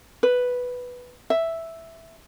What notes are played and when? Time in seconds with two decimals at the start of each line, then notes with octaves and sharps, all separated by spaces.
0.23 B4
1.30 E5